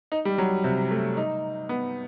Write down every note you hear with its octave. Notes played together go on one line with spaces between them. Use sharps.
D#4
G3
F#3
C3
A3
D#4
B3